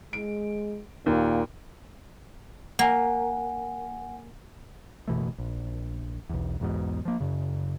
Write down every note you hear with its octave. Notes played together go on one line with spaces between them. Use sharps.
G#3 D7
D#2 A#2
A#3 F#5 G#5
F#1 B2 E3 A3
A#1
B1 E2
B1 E2 G#2 B2
F3 A#3
F#2 C#3